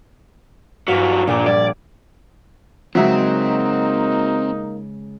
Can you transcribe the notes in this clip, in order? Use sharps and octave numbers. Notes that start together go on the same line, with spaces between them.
G2 E3 F#3 F5 B6
A#1 A#2 A#3 D6
G3 D5 G#6
C#3 F#3 G#3 A#3 C4 D#4 E5